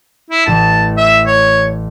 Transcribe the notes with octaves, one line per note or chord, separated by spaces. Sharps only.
E4
A1 A2 A5 E7
E5
C#5